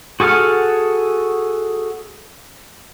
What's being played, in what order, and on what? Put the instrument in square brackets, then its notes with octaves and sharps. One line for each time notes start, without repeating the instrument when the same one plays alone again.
[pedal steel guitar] F#4 G#4 A4 F#5 F6